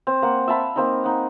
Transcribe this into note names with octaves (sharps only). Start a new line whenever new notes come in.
C4
A#3 F#5
E5 F5 A5 B5
A#3 C4 D#4
D#4 F#5